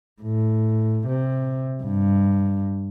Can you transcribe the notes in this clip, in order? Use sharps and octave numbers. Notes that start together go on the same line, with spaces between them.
A2
C3
G2